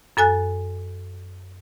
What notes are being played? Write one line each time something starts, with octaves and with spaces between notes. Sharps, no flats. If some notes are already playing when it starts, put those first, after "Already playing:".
F#2 A4 G#5 F#6